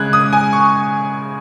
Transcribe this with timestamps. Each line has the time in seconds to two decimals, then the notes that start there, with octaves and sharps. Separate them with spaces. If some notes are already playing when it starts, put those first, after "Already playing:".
Already playing: C#3 G#3 F#6 G#6
0.13 D#6
0.33 G#5
0.53 C#6